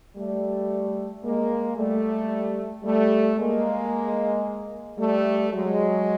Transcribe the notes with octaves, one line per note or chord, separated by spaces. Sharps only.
G3 A3
G#3 A#3
G3 A3
G3 A3
G#3 A#3
G3 A3
F#3 G#3